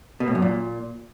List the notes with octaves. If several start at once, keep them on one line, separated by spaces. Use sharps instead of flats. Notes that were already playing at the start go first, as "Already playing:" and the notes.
B2
A2
F#2
A#2